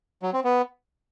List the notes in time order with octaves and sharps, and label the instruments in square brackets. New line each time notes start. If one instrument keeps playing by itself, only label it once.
[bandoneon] F#3
C4
B3